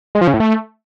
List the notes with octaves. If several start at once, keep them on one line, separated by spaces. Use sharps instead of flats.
G#3
F3
C#3
A2
A3